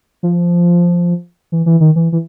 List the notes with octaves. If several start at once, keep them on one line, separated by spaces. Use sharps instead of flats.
F3
E3
E3
D#3
E3
E3